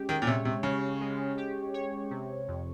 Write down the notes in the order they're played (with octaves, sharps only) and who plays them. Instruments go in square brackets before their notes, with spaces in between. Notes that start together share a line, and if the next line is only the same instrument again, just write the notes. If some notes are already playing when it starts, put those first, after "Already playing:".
Already playing: [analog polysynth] G#3 C#4 G4
[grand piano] D#3
A#2
[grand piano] C3 [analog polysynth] C#5
[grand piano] C3
[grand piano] C#3 [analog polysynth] C#4
[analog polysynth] G#3
G4
C#5
C3
F2